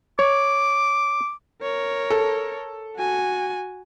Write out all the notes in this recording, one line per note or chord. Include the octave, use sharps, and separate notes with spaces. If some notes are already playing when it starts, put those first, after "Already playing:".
C#5 D6
A#4 C#5
A4
F#4 G#5